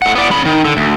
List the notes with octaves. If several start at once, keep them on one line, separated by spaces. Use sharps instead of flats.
A2 F#5
B3 D5
C#4 B5
D#3
D3
D2